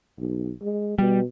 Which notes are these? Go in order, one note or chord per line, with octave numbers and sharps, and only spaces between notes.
B1
G#3
B2 G3